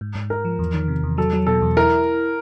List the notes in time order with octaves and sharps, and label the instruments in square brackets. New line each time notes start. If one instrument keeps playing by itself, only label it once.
[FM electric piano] G#2
G#2
[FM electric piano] G#2 [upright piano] A#4
[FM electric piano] F3
E2
D#3
C3
E2
[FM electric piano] F#3 [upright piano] A4
[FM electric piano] F#3
[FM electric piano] B2 [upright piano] A4
[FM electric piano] E2
[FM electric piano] E4 [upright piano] A#4